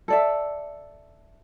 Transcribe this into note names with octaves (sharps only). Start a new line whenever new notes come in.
A4 D5 E5